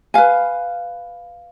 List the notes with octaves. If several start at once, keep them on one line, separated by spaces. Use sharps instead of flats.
B4 F5 G#5